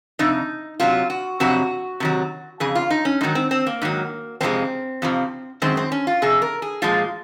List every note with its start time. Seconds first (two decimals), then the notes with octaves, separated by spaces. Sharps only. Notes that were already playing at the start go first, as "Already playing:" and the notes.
0.19 F2 C3 D#4
0.80 C3 F#3 F4
1.10 F#4
1.40 F2 C3 F#3 F#4
2.00 C3 D#3 F#3
2.60 F2 C#3 G#4
2.75 F4
2.90 D#4
3.05 C#4
3.21 G#2 D#3 F#3 D#4
3.35 C4
3.51 C4
3.67 A#3
3.82 G#2 D#3 F#3
4.41 F2 C3 F3 G#3 C4
5.02 F2 C3 F3
5.62 F#2 D#3 G#3 C4
5.77 C4
5.92 C#4
6.07 F4
6.22 F2 C3 G#4
6.42 A#4
6.62 G#4
6.82 A#2 F3 G#3 F4